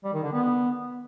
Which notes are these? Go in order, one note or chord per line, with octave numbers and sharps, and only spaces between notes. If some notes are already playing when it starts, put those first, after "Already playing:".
G3
D#3
D3
B3